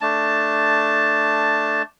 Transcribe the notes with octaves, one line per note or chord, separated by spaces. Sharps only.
A3 D4 A5